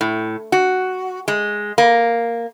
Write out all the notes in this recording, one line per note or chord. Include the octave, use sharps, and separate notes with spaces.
A2
F#4
G#3
A#3